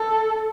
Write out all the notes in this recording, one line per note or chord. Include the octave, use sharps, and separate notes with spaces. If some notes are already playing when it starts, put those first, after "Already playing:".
Already playing: A4